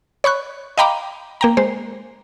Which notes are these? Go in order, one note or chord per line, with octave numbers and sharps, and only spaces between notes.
C#5 B5 C#6 F#6
D#5 F5 G5 A#5 B5 D6
A#3 G5 A#5
G#3 C5